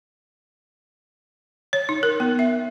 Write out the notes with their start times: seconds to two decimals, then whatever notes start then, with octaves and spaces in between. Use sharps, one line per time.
1.73 C#5
1.89 D#4
2.03 A#4
2.20 B3
2.39 E5